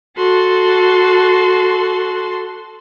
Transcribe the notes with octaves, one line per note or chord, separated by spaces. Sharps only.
F#4 A4 C6